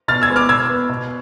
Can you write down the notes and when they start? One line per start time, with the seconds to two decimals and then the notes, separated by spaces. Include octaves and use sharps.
0.08 B2 F6 A6
0.22 E6 G#6
0.29 G#3 B3
0.36 D6 F6
0.49 B2 E6 G#6
0.70 B3
0.89 B2